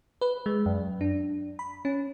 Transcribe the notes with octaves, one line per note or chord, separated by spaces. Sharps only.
B4
G#3
F#2
D4
B5
C#4